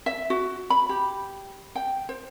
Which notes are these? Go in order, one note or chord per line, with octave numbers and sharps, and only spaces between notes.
E5
F#4
B5
G4
G5
C5